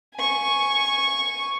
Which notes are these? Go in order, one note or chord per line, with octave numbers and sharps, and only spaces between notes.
G#5 C#6